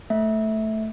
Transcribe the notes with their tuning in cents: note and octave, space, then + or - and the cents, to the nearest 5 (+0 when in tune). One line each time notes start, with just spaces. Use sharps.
A3 +0 E5 -15